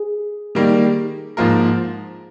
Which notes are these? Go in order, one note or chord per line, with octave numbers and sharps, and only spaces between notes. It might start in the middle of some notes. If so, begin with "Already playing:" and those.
Already playing: G#4
D#3 G3 A#3
G#2 F3 A#3 F4 A#4